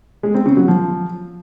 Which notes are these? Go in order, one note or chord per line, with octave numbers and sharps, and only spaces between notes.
G#3
C4
C#3
F#3
F3